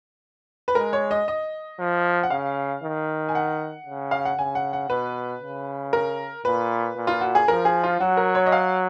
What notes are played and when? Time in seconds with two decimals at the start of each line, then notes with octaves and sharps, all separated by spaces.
0.68 B4
0.75 G#3 A#4
0.93 C#5
1.11 D#5
1.28 D#5
1.79 F3
2.23 F#5
2.30 C#3 F5
2.83 D#3
3.29 G#5
3.35 F#5
3.86 C#3
4.11 F5
4.25 F#5
4.38 C#3 G#5
4.55 F#5
4.73 F#5
4.89 B2 B4
5.42 C#3
5.93 A#4
6.45 A#2 B4
6.97 A#2
7.07 F4
7.21 F#4
7.35 G#4
7.48 F3 A#4
7.65 G#4
7.84 F4
8.00 F#3 F#4
8.17 A#4
8.35 C#5
8.46 D#5
8.52 F5